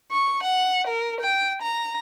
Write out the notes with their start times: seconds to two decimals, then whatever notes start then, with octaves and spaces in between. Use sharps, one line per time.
0.12 C#6
0.43 F#5
0.88 A#4
1.21 G5
1.62 A#5